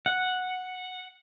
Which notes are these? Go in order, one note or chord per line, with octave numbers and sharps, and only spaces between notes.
F#5